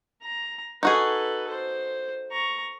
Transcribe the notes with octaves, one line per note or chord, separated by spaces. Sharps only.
A#5
D#4 F#4 G#4 A4 B4
C5
A#5 C#6